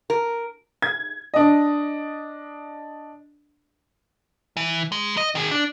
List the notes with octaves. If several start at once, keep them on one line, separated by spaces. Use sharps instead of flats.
A#4
G#6
D4 D#5
E3
G#3
D#5
D#3 G#4
D4